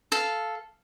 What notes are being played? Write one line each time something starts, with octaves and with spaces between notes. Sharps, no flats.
A4 F5